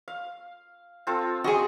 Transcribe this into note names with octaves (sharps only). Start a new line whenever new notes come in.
F5
C4 F4 A4
F#4 G#4 D#5 C6 C#6